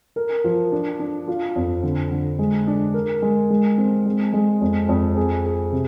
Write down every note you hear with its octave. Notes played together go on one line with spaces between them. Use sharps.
A#4
F3
D4
D4
F4
F2
D3
D3
G#3
D4
A#4
G#3
G#3
C4
G#3
G#3
F2
F2
G#4
G#4
C3